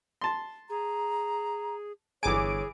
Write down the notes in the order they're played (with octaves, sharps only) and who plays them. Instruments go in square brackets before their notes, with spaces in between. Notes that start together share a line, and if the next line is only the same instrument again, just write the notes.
[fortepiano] A5 C6
[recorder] G#4 [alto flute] A#5
[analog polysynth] G1 D6 D7 [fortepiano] E3 G#5 [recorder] G#4 [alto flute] C#5